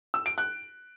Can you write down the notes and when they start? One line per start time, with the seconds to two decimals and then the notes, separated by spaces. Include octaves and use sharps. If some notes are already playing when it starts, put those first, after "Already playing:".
0.14 E6
0.26 D7
0.38 F#6